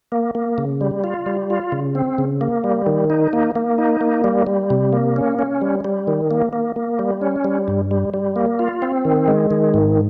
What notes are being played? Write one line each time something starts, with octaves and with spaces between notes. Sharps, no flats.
A#3
A#3
C#3
G3
F4
G3
F4
C#3
C4
C#3
A#3
G3
D#3
D#4
A#3
A#3
D#4
A#3
G3
G3
C3
A#3
C#4
C#4
G3
G3
D#3
A#3
A#3
A#3
G3
C#4
G3
G2
G3
G3
A#3
F4
C4
D#3
G#3
D#3
G#2